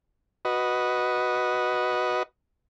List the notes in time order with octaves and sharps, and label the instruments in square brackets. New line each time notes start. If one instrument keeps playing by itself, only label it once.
[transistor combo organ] F#4 B4 D#5